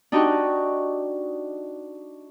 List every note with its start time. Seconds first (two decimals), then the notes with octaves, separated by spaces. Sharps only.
0.12 D4 D#4 F#4 G4 C#6